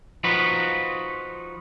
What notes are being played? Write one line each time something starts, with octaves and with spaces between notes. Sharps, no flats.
F3 D#4 F4 F#4 B4